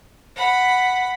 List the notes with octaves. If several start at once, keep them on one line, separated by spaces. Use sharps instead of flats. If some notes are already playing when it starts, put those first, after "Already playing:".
F#5 B5